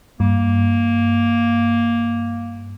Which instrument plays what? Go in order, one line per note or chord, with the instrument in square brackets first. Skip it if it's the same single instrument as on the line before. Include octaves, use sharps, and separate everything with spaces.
[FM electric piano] G2 [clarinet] A#3